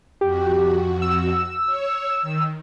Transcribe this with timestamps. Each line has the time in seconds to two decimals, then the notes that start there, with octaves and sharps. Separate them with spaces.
0.21 F2 F#4 G4
1.02 E6
1.66 C#5
2.22 D#3